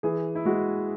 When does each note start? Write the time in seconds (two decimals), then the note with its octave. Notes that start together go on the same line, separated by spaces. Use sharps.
0.03 E3 G#4
0.35 E4
0.45 G#3 F#4